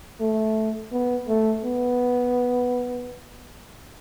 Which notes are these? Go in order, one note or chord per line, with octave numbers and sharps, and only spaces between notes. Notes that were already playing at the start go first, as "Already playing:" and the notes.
A3
B3
A3
B3